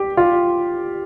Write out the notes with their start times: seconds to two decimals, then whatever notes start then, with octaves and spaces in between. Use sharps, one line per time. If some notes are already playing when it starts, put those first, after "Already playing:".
Already playing: G4
0.17 F4